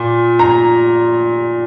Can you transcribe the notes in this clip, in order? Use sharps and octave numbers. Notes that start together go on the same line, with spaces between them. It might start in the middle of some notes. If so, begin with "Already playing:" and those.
Already playing: A#2
A#5